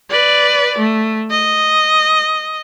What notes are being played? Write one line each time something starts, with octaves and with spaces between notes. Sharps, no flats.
B4 D5
A3
D#5